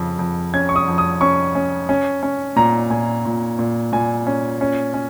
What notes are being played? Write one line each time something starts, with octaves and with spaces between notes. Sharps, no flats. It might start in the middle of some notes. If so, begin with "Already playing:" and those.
Already playing: F2 C#3
F2
C#4 G#6
C#6
D#6
F2
D#6
C#4 C#6
C#4
C#4
C#4
A#2 A#5
A#2 G#5
A#2
A#2
A#2 G#5
C#4
C#4
C#4